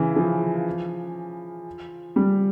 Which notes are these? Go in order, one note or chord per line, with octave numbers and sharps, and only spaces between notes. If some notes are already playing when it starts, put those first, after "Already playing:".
Already playing: C#3 E3
F3
G3